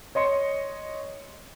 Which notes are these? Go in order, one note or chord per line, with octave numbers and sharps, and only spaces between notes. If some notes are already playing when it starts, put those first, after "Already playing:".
C#5 D#5 C6 C#7